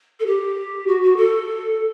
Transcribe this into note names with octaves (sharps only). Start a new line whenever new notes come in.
A4
G4
F#4
F#4
A4